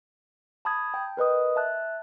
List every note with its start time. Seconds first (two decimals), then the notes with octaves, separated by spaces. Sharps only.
0.65 A5 B5 D#6 G#6
0.94 G5
1.17 A#4 B4 D#5 D#6
1.56 E5 A5 F#6